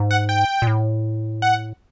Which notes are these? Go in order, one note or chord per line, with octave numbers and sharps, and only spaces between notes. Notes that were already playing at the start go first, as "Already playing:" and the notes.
Already playing: G#2
F#5
G5
A#2
A2
F#5